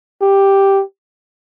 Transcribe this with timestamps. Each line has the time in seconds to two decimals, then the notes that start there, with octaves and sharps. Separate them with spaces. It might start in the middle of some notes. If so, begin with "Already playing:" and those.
0.22 G4